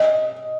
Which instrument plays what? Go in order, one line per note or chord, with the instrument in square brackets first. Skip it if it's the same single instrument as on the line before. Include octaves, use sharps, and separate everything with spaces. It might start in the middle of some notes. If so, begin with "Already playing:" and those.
Already playing: [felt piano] D#5